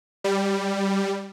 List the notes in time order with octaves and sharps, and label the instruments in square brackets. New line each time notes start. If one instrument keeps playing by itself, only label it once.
[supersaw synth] G3